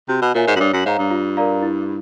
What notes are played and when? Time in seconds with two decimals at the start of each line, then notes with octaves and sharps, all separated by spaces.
0.08 C3 F#4
0.22 B2
0.35 A#2 A#4 C#5 E5 G#5
0.47 G#2
0.56 F#2
0.60 G2 C#5
0.73 F#2
0.86 G#2 F5 A#5
0.99 G2
1.11 F4
1.37 A#4 D5 F5 A#5
1.62 E4